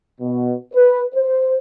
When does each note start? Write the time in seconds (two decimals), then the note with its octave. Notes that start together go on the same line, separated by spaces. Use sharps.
0.21 B2
0.73 B4
1.15 C5